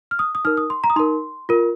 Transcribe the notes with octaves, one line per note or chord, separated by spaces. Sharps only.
F6
D#6
D#6
D#4 A#4 F6
D#6
C6
A#5
D#6
D#4 A#4 C6
F4 A#4